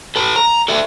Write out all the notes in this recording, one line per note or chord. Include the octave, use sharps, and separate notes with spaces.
A4 B4
A#5
A4 D5 E5